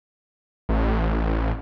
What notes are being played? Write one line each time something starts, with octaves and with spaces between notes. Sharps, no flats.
A1